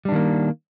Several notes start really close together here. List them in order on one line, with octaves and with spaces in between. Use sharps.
G3 D4 D#3 A#3